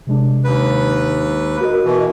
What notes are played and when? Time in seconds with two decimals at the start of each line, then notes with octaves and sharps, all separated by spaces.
0.07 C3 G#3 D4
0.44 D#2 B4
1.60 F#4 A#4 D#5
1.85 B2 E3